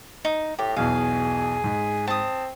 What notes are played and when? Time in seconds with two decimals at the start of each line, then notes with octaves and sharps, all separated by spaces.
0.25 D#4
0.59 A2 G4
0.76 B1 E2 B2 G#4 F5
1.64 G#2
2.07 C4 A5 D#6